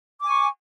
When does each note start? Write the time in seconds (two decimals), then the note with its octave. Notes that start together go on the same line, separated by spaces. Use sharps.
0.21 D6
0.24 G#5
0.27 C#6